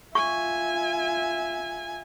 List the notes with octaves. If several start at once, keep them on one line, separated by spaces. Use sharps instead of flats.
F4 E5 G#5 C#6